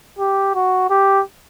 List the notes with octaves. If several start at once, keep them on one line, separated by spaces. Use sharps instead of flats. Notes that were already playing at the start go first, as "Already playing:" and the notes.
G4
F#4
G4